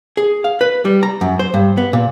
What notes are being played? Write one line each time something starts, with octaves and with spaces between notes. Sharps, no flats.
G#4
F5
B4
G3
A#5
F#2
C5
G2
B3
A#2